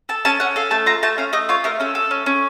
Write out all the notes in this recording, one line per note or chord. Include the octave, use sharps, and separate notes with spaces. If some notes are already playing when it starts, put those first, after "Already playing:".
A4 A5
C#4 A5
C#4 F#5
A4 F5
A3 A5
F4 A#5
A3 A5
C#4 F5
A3 D#5
F4 C#5
A3 A#4
C#4 A4
A4
C#4
C#4